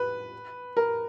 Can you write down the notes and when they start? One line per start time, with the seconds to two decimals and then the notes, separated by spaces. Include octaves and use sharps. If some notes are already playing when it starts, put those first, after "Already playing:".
Already playing: B4
0.77 A#4